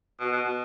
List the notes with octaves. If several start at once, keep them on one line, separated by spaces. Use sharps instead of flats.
B2
B2
B2